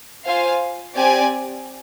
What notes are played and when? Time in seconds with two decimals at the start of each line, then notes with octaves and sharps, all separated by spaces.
0.26 F4 C5 F5 G#5
0.97 C4 G4 D5 G#5